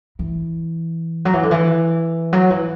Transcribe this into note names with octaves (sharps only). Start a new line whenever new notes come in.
E3
F#3
E3
D3
E3
F#3
E3